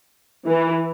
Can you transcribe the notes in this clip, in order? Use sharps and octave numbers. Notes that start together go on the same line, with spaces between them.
E3